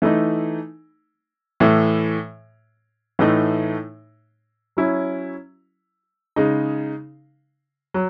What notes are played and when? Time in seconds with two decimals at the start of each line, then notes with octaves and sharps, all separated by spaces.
0.02 E3 A3 D#4
1.60 A2 E3 A3
3.19 A2 E3 A3 D#4
4.77 F#3 C#4 E4
6.36 C#3 G#3 D#4
7.94 F#3